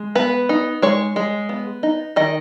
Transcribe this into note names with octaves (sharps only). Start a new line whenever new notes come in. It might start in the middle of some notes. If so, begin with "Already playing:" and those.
Already playing: G#3
B3 B4
D#4
G#3 C#5
G#3
B3
D#4
D#3 D#5